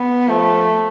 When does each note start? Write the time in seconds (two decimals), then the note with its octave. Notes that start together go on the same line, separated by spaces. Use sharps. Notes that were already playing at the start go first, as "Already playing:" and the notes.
Already playing: B3
0.28 F3 A3